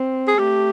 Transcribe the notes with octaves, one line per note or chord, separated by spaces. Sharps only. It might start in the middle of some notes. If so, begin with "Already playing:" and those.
Already playing: C4
G#4
A3 G4